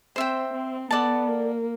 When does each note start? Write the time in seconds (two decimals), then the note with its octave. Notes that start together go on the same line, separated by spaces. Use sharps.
0.16 C4 C5 E5 G5
0.53 C4
0.91 B3 A4 D5 F#5 A5
1.28 A#3